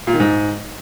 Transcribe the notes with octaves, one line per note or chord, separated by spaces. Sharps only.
A#2
D#3
G#2